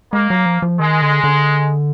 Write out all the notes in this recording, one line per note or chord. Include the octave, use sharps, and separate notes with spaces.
G#3 A#3
F#3
F3
F3
D#3 G#3
D3
D3